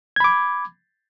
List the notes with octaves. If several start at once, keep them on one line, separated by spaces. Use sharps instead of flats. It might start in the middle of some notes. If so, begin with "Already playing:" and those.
B5 D6 G#6